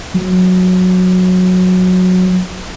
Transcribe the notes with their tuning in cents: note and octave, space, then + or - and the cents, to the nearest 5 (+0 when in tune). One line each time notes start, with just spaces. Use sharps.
F#3 -15